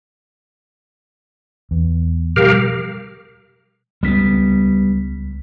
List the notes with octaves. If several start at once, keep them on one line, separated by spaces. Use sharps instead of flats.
E2
B2 F3 G3 G4 A#4 F5
C#2 G3 A3 B3 B6